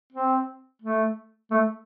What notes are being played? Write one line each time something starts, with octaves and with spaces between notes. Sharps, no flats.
C4
A3
A3